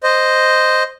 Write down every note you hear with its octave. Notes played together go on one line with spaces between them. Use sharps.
C5 D#5